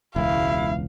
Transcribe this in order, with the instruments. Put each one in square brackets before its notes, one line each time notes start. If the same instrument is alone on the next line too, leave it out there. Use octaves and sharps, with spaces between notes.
[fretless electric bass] E1 C#2 [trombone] E4 [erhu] F5